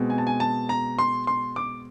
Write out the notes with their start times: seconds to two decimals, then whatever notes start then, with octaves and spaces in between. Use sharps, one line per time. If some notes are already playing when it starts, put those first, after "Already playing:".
Already playing: B2 G#3 C4
0.10 G#5
0.18 A5
0.27 G#5
0.40 A5
0.69 A#5
0.99 C6
1.27 C6
1.56 D6